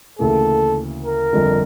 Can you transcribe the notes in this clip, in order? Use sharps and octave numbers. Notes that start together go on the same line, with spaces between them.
D2 C#3 E3 A#3 A4
A#4
G1 F2 D3